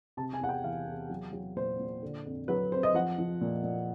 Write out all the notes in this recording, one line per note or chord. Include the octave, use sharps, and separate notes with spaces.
C3 A5
G#5
E2 F#5
G5
E3 F5
E2
F#3
F#3
A#2 C5
A#2
D3
F2
F#3 B4
F2 C5
D#5
F3 F#5
F3
A#2
A#2